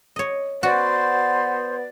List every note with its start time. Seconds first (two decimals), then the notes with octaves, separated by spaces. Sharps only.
0.16 C#5 D#5
0.63 B3 F#4 C5 D5